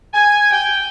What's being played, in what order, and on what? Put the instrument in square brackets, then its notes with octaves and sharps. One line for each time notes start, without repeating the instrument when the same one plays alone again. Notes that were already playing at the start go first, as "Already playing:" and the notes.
[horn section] G#5
G5